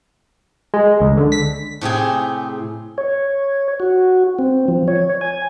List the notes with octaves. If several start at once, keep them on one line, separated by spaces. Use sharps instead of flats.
G#3
C#2
D3
B6
A2 C3 G4 G#4
C#5
F#4
C4
F3
C#5
G#5